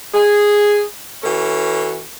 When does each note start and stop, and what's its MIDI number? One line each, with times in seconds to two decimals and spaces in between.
0.13 0.82 68
1.23 2.01 52
1.23 2.01 61
1.23 2.01 66
1.23 2.01 69